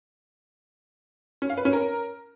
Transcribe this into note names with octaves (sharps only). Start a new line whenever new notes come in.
C#4
F5
B4
C#4
A#4